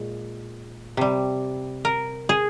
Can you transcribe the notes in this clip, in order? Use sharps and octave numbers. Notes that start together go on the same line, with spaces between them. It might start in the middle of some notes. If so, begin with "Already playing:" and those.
Already playing: A#2 G#3
C3 G3
A#4
G#4